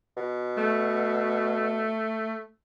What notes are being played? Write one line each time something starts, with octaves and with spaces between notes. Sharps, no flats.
B2
A3